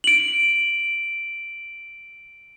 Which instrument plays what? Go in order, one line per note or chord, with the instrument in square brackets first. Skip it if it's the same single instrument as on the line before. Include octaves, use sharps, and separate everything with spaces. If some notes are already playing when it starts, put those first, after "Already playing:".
[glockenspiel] D7 F#7